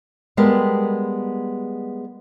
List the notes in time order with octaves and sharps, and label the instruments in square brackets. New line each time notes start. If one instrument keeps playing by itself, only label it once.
[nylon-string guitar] G3 G#3 B3 G4 A#4 A5